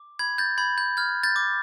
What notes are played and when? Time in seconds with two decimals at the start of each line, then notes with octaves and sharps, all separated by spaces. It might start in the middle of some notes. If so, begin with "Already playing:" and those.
Already playing: D6
0.19 B5 G#6
0.38 G6 A6
0.58 B5 G#6
0.78 G6
0.97 F6 G#6
1.23 G6 A6
1.36 D6